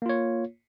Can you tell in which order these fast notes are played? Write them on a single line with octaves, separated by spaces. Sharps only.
A#3 F4 C#5